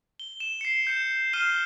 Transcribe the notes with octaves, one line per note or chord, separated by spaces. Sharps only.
G7
E7
C7 C#7
G6 C#7 E7
F6 C7 D#7 E7 G7